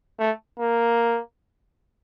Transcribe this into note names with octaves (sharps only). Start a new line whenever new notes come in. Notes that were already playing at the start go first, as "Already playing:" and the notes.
A3
A#3